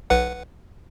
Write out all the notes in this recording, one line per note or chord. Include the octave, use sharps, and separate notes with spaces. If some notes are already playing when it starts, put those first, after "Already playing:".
B1 B4 F#5